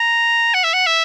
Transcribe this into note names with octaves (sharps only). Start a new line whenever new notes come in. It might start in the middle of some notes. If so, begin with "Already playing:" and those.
Already playing: A#5
F#5
E5
F#5
E5